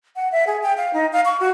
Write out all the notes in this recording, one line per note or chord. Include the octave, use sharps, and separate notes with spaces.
F#5
E5
G#4
G5
F5
D#4
F5
C#6
F#4